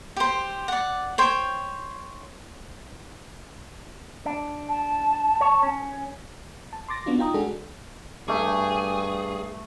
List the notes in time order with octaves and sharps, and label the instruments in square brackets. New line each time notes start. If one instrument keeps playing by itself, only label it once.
[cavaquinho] G4 C5
D5 F#5
C5 C#5 G5
[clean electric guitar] D4
[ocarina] A5
[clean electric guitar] C#5
C#4
[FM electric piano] A5
C6 D6 A6 A#6
B3 D4 F4 F#4
D#4 F4 G5 A#5 D#6
G#3 D4 F#4 G#4 A4
[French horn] G2 [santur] A3 D6 [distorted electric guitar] G#4